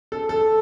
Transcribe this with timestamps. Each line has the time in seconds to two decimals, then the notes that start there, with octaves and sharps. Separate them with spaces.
0.12 A4
0.29 A4